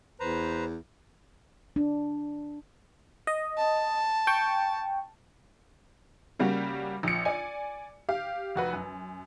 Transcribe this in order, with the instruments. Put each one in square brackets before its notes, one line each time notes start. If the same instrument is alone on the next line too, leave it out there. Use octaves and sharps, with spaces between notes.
[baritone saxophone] E2 [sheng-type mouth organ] B4 C5 A#5
[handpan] D4
[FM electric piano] D#5
[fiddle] A5
[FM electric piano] G5 C#6
[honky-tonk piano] C#3 G3 A#3 F#4 G4
A#1 C#7
D5 G#5
G4 F5
F1 F#4 B4
F#2